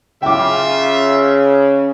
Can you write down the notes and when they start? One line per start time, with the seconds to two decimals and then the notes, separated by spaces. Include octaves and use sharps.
0.22 C#3 F4 E5 G5 D6